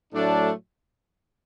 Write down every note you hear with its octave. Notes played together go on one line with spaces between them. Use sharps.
A2 F#3 A3 D4